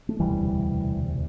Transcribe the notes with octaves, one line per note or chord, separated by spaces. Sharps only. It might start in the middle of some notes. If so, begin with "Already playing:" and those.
A3
E1 D2 C3 E3 G3